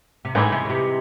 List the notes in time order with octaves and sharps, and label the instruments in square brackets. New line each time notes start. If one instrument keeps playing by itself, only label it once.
[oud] C3
[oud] A2 [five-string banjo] E3 G#3 D#4 G#4
[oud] C3
C#3
C3